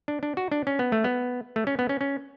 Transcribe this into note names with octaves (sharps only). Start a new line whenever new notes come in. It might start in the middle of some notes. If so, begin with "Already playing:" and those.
D4
D4
F#4
D4
C#4
B3
A3
B3
A3
C#4
B3
C#4
C#4